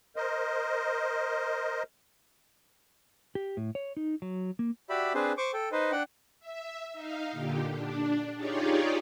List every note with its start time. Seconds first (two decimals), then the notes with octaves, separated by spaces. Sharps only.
0.16 A#4 C5 D#5
3.35 G4
3.57 A2
3.75 C#5
3.97 D#4
4.22 F#3
4.59 A#3
4.90 F#4 G4 D5 E5 B5
5.14 C4 D4 G#4 B4 C5
5.38 C5 C#6 D6
5.54 A4 G5
5.72 D#4 B4 C5 D#5
5.92 D4 F#5 G5
6.39 E5
6.93 D#4 F5
7.32 A#2 D3 G4
7.70 D4
8.35 D#4 F4 G4 G#4 C#5 D5